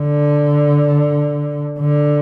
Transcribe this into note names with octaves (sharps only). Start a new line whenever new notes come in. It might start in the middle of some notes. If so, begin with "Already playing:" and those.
Already playing: D3
D3